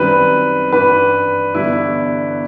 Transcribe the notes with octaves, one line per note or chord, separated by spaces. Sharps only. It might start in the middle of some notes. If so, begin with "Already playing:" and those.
Already playing: F#2 D#3 G3 C4 E4 B4
G2 E3 G3 B4
G1 G2 E3 G3 B3 E4